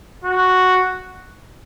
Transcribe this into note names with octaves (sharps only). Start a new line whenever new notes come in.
F#4